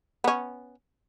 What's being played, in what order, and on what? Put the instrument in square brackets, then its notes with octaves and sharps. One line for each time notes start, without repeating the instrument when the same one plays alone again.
[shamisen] B3 C#4